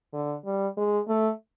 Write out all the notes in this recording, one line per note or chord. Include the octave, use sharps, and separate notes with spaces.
D3
G3
G#3
A3